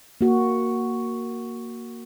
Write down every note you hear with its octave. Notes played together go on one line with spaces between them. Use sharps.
A#3 F#4